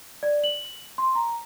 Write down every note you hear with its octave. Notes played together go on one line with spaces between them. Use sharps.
D5
F#7
C6
A#5